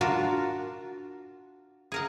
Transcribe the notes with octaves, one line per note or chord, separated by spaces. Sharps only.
D4 F4 F#4 A#4
G#4 A#4 F#5